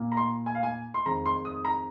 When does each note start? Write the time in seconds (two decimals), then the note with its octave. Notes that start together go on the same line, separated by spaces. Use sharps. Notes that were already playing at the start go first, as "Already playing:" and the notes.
Already playing: A#2 A#3
0.12 A#5
0.17 C6
0.46 G#5
0.55 F5
0.63 G#5
0.94 C6
1.06 F2 D#3 G#3 A#5
1.26 C6
1.45 D#6
1.65 A#5